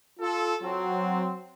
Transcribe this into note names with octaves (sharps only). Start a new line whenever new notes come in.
F4 A4
F#3 C4